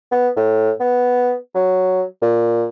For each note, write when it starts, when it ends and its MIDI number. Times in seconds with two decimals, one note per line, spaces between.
0.11 0.29 59
0.36 0.71 45
0.80 1.34 59
1.55 2.04 54
2.22 2.68 46